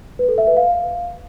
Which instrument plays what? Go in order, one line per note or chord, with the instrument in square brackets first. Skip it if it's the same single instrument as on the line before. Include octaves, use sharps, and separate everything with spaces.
[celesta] B4
A4
E5
B4
F5